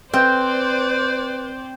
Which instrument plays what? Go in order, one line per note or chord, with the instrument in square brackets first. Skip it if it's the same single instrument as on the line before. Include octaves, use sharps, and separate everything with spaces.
[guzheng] C4 [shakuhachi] B4 [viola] C5 D5 [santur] G5